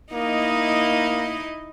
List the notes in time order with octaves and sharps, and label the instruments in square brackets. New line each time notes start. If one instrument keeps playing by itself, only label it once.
[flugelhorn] A#3 [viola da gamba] D#4 E4 D#5